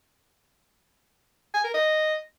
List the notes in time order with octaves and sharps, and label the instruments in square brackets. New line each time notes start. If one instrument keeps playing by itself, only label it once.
[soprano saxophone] G#5
A#4
D#5